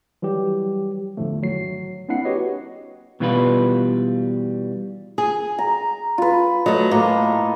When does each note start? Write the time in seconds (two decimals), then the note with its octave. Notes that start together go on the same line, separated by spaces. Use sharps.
0.22 E3 F#3 G3 G4
1.17 E2 A2 D3 F3 A3
1.42 G#1 F#3 C7
2.09 A#3 C4 D4 E4 F#5 C7
2.25 F#4 G4 B4 C#5 D#5
3.20 B2 E3 G3 F4 G4 B4
5.18 G#4
5.59 A#5
6.18 F4 B4
6.66 F#3 A3 D#5
6.91 A2 A#3